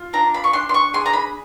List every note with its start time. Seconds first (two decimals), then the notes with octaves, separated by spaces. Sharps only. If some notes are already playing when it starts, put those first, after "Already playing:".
Already playing: F4
0.13 D4 A#5
0.34 B5
0.44 C#6
0.53 D4 C6
0.69 C6
0.74 C#6
0.94 G#4 C6
1.06 A#5
1.13 B5